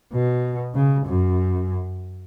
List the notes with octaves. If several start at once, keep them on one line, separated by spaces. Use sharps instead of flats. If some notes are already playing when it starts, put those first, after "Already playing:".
B2
C#3
F#2